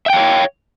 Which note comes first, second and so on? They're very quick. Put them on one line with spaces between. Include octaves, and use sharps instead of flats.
E5 G5 F5 C#5